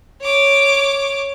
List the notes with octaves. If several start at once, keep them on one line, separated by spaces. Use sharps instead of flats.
C#5 D6